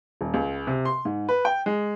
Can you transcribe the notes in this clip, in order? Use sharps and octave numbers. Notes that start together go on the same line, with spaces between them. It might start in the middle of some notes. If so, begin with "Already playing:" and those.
D#1
C#2
C3
C6
G#2
B4
G5
G#3